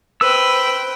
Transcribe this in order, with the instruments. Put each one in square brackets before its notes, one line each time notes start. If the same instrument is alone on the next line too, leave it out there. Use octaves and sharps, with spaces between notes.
[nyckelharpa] B4 [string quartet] C5 G5 [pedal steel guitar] E6